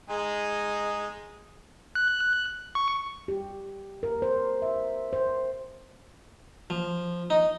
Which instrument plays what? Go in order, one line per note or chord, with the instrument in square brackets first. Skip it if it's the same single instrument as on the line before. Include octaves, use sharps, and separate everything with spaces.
[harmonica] G#3 D#4 G#4
[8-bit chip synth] F#6
C#6
[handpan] G4
A#4
C5
E5
C5
[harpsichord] F3
D#4